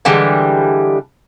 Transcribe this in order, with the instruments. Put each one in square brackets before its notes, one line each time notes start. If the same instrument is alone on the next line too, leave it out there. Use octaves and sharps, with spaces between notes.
[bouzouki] D3 E3 G3 G#3